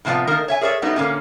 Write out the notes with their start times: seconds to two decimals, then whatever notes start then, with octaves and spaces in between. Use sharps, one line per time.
0.05 A2 C3 F3 B3 D5
0.27 D#3 A3 A#3 D#4 A#4 A#5
0.48 C#5 E5 G#5
0.61 G#4 A#4 C#5 D5 E5
0.82 F#3 G3 A3 B3 D#4
0.96 A#2 D3 A#3 C#4